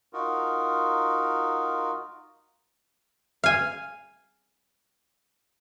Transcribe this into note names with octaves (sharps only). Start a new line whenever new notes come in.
D#4 F4 F#4 A#4
F5 G#5